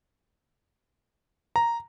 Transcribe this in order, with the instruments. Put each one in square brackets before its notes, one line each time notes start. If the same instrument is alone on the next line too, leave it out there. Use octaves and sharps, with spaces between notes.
[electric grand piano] A#5